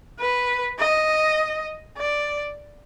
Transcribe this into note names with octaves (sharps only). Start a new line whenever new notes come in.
B4
D#5
D5